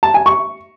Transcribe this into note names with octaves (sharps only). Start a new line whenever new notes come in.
A5
G#5
C#6